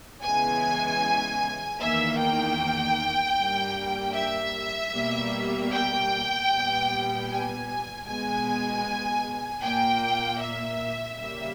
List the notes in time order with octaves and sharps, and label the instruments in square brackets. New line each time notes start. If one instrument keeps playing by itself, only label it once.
[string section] C#3 E3 G#3 B3 G#5
E2 D#3 A#3 E5
G5
G2 G3 A#3
E5
B2 G3 A#3
G5
A#2 G3 B3
G#5
B2 G#3 B3 G#5
A#2 A#3 G5
E5
C#3 G3 A#3 E5